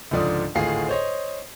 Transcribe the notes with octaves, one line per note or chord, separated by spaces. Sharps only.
C#2 G#2 D3 F3 D5 D#6
G#1 D2 A2 F4 G#4 C7
C5 C#5 D#5